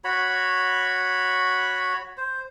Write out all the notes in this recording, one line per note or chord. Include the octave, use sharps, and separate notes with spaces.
F#4 C#5 B5
C5